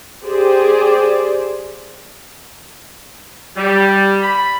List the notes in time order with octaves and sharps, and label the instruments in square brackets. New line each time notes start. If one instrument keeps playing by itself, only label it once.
[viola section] G4 G#4 C5 D5
[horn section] G3
B5